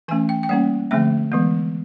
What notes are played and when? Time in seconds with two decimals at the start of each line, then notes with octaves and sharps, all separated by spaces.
0.08 E3 A3 C#4 G#5
0.29 G5
0.43 G5
0.49 G3 A#3 C#4 F#5
0.91 D3 F3 A3 C4 E5
1.32 E3 G#3 B3